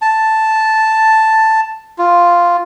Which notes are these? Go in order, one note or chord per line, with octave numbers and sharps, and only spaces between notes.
A5
F4